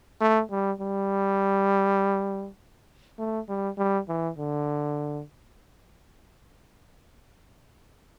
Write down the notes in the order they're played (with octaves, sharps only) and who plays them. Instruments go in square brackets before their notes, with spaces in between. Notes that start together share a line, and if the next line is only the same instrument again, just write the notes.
[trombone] A3
G3
G3
A3
G3
G3
E3
D3